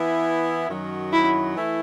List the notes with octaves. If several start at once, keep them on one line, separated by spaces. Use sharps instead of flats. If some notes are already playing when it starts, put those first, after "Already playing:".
Already playing: E3 B3 E4
F#2 D#3 F#3
E4
E3 A3 E4